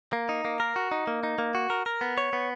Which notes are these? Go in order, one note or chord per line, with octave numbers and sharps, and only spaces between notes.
A#3
D#4
A#3
A#4
F#4
D#4
A#3
D#4
A#3
F#4
A#4
A#4
B3
C#5
B3